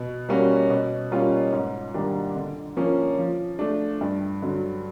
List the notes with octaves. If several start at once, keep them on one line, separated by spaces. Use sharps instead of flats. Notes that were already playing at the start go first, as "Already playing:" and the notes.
Already playing: B2
G3 A#3 C#4 F#4
B2
G3 A#3 C#4 F4
G#2
D#3 G3 A#3 D4
D3
F3 A#3 C#4
F3
A3 D4
G2
D3 F#3